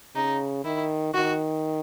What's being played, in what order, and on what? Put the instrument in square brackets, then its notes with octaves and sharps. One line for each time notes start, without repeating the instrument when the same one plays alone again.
[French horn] C#3 [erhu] D#4
[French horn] D#3 [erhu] E4
[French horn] D#3 [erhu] F#4